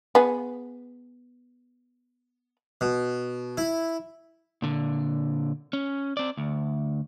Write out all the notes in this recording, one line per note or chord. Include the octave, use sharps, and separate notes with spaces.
B3 G#4
B2
E4
A#2 D3
C#4
C4 D5
D2